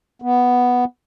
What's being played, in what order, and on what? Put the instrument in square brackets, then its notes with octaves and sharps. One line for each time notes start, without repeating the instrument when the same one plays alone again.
[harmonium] B3